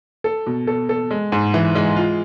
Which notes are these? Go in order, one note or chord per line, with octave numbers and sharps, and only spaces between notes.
A4
B2
A4
A4
G#3
G#2
E3
G#3
F4